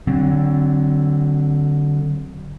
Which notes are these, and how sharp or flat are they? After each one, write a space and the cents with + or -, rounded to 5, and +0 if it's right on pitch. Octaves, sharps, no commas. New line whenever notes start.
D3 +0 F#3 +15 C4 +15